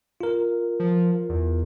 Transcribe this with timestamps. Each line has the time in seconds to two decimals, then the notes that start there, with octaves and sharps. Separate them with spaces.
0.21 F4 A#4
0.80 F3
1.29 E2